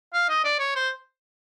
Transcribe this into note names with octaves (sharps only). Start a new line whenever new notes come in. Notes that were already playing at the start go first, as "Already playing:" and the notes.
F5
D#5
D5
C#5
C5